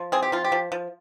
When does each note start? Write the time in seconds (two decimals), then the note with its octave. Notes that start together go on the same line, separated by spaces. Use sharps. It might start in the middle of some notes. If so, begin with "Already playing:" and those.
Already playing: F3
0.12 C4 G#4
0.23 G4
0.32 F3 F4
0.44 G4
0.52 F3
0.72 F3